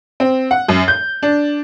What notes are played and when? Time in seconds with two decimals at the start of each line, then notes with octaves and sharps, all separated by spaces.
0.20 C4
0.51 F#5
0.68 F#2
0.88 G6
1.23 D4